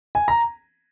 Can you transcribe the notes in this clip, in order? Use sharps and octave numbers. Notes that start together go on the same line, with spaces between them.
G#5
A#5